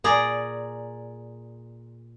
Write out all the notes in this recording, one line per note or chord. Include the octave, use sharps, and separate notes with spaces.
A#2 G#4 D5 A#5